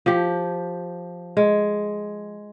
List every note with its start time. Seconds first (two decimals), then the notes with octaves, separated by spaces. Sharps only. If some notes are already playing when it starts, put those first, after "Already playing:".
0.06 F3 G4
1.37 G#3